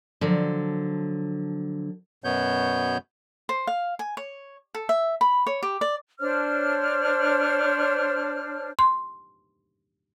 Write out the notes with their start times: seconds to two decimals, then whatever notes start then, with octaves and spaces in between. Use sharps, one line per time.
0.21 D3 F3 F#3
2.24 F#2 B2 B3 C#5 G6
3.49 C5
3.67 F5
3.99 G#5
4.17 C#5
4.75 A4
4.89 E5
5.21 B5
5.47 C#5
5.63 G4
5.81 D5
6.19 D4 C5 C#5 F6
8.79 C6